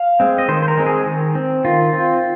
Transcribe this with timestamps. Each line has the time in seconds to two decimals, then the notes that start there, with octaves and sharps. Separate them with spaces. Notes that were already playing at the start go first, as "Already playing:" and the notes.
Already playing: F5
0.20 G#3 C4
0.38 D#5
0.48 D#3 C5
0.62 C5
0.68 A#4
0.77 G#3 C4
0.86 G#4
1.06 D#3
1.35 C4
1.65 D#3 F4
1.93 C4